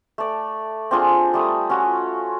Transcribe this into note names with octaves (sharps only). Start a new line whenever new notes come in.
A3 D5
C4 D4 F4 G#4
G3 A3 D#6
C#4 F4 F#4